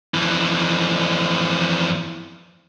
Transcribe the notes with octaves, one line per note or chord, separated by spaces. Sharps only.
F2 E3